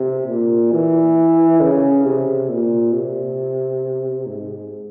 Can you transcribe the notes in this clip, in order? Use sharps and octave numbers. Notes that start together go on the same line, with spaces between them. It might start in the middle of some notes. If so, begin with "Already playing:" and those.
Already playing: C3
A#2
E3
C#3
C3
A#2
C3
G#2